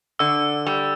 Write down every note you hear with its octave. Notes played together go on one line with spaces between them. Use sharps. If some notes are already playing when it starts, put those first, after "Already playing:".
D3 E6
G3